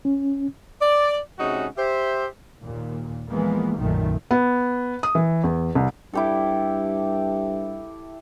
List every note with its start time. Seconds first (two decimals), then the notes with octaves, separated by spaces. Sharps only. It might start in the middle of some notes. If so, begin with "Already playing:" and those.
0.05 C#4
0.82 D5
1.39 C3 G#3 C#4 D#4 F#4 G#4
1.78 G4 C5 E5
2.61 D#2 A#2
3.28 E3 F3 G#3 A#3 B3
3.77 B1 F#2 A#2 D#3 A3
4.31 B3
5.03 D#6
5.15 E3
5.44 E2
5.75 C2
6.13 G2 E4 G4 A4